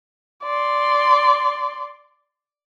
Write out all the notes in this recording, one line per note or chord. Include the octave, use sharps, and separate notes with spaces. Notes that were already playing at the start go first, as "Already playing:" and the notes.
D5 C6